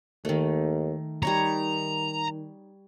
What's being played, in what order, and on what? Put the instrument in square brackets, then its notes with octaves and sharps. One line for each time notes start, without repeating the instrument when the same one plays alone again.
[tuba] D#2 [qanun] D#3 A3
[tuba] D#3 [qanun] G3 D#4 C#5 [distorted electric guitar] A#5